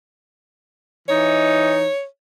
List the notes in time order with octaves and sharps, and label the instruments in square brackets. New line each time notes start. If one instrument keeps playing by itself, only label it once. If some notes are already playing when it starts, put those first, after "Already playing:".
[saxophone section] E3 D#4 [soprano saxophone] C#5